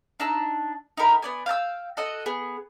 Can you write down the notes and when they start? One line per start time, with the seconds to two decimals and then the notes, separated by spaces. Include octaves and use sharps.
0.20 D4 D#4 A5 E6
0.97 D#4 G4 A#4 B5
1.22 B3 D5 G#5
1.46 F5 G5 A5 E6
1.97 F#4 A4 D#5 F#5
2.26 B3 G#4